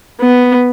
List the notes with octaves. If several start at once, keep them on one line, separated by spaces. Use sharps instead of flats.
B3